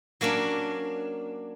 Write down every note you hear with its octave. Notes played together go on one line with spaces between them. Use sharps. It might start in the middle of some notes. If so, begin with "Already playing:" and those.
F#3 A#3 C#4 D4